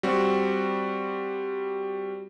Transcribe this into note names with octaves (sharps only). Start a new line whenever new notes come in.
G3 C4 F#4